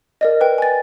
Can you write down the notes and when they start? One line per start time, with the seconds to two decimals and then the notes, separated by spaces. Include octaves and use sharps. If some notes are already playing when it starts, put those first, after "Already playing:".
0.21 A#4 D5 D#5
0.41 B4 G5
0.58 G#5 A6